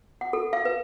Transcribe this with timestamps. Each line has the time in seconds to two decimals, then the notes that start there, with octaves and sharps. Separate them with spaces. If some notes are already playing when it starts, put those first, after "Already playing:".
0.21 F#5
0.33 A4
0.53 F5
0.65 B4